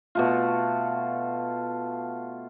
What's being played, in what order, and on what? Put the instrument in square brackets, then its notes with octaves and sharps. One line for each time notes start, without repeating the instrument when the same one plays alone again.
[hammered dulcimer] B2 A3 F4